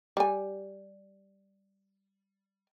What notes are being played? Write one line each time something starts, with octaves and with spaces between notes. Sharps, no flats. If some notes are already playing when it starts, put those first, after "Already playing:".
G3 G#5